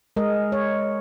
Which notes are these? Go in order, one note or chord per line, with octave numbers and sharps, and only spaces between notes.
G#3 A#4 D#5
C#5